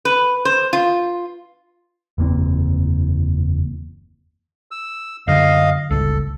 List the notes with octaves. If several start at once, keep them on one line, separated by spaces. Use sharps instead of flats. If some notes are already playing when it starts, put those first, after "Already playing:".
B4
C5
F4
F#1 E2 A#3 C4
E6
F#2 D3 D#5 F5
G1 C#2 A4